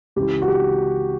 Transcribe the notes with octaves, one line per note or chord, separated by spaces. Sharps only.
C#2 C#3 E3 G4
F#4
G4